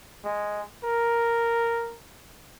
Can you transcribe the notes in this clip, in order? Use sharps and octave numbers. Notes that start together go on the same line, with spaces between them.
G#3
A#4